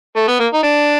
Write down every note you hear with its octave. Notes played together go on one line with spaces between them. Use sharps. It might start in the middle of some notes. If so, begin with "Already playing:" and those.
A3
B3
A#3
D#4
D4